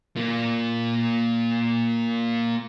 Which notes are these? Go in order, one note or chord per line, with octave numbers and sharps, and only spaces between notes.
A#3 F4